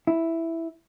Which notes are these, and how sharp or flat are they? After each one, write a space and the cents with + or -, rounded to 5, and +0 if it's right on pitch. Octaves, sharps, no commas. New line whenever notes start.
E4 +0